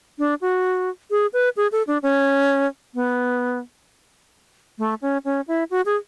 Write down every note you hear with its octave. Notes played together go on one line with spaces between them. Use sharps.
D4
F#4
G#4
B4
G#4
A4
D4
C#4
B3
A3
C#4
C#4
E4
F#4
G#4